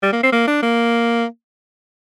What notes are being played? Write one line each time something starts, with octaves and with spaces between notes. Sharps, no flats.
G3
A#3
C4
A#3
D4
A#3